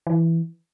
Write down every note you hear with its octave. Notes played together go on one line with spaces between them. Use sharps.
E3